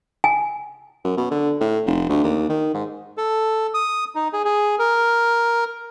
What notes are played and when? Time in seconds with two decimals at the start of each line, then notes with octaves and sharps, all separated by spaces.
0.24 G#5
1.05 F#2
1.17 B2
1.31 D3
1.61 A2
1.86 F1
2.09 D2
2.24 D#2
2.50 D#3
2.75 G#2
3.17 A4
3.74 D#6
4.15 D#4
4.33 G#4
4.45 G#4
4.79 A#4